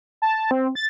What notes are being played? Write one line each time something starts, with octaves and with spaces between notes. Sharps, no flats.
A5
C4
A6